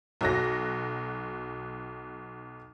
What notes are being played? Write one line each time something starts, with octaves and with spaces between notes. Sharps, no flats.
B1 F#4 A#6